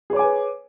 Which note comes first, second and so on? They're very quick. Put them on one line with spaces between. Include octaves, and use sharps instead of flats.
G#4 C#5 D6 G#5 B4